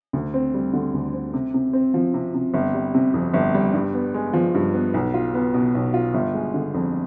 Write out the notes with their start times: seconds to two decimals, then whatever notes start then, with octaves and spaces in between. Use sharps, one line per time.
0.13 D2
0.34 C4
0.54 G3
0.73 D3
0.94 D2
1.14 C4
1.33 C3
1.54 C3
1.73 C4
1.94 F3
2.14 C3
2.34 C3
2.54 G1
2.74 G3
2.94 C3
3.14 F2
3.33 G1
3.54 G3
3.74 G2
3.94 B3
4.14 G#3
4.33 F3
4.54 G2
4.74 B3
4.94 B1
5.14 F4
5.34 B3
5.54 B2
5.75 B1
5.94 F4
6.14 G1
6.34 G#3
6.54 D3
6.74 F2